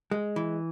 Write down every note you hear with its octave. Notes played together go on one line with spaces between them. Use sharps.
G#3
E3